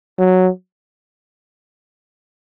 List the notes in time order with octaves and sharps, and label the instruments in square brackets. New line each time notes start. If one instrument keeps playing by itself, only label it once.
[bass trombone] F#3